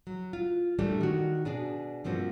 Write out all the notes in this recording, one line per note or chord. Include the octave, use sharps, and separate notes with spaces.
F#3
F4
A#2 E3 G3 A3 D4 G4
D#3 F#4
B2 D4 G#4
G2 F3 A#3 C4 F#4